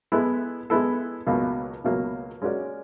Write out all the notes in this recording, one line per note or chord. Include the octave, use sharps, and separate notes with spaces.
G#3 B3 E4 A4
G#3 B3 E4 A4
C#2 B2 F#3 A#3
C#2 B2 F#3 A#3
G#3 C#4 F#4 A#4 D5